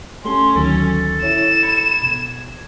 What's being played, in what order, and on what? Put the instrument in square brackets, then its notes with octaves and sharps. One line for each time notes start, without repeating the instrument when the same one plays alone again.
[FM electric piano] A3 G4 A4 [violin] C#4 [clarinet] C6
[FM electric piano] D2 D#3 F#3 [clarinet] A4
[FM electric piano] E4 C#5 [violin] E7
[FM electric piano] B5 G#6 C#7
B2 G#6